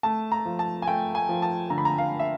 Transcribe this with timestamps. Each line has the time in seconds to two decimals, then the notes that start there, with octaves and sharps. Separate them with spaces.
0.03 A3 A5
0.32 A#5
0.46 F3
0.59 A5
0.82 G#5
0.87 A3 G5
1.15 G#5
1.29 F3
1.42 A5
1.70 D3 A#5
1.78 B5
1.85 A#5
1.98 F5
2.20 E5